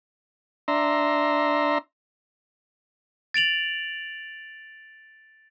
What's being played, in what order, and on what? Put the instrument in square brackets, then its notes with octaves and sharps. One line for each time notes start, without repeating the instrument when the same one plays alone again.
[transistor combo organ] D4 E5 A#5 C6
[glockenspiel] A6 D7 F7 F#7